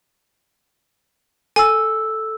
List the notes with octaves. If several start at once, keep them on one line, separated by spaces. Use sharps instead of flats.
A4 G#5 E6